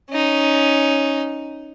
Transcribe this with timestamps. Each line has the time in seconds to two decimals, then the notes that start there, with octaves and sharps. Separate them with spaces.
0.10 C#4 D#4